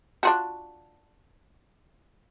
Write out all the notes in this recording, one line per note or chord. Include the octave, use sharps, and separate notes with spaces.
D4 F4 F#4